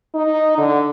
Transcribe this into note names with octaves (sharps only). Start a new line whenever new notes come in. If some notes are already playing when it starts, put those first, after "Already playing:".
D#4
D3